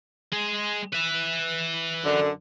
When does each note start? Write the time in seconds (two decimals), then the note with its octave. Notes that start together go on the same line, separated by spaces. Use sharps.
0.33 G#3 G#4
0.93 B4 E5
2.04 F#2 D3